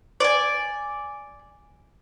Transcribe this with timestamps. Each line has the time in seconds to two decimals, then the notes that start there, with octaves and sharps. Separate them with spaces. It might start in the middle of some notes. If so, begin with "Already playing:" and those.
0.20 D5 G#5